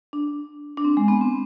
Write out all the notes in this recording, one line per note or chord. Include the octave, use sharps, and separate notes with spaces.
D4
D4
C4
G#3
B3
C4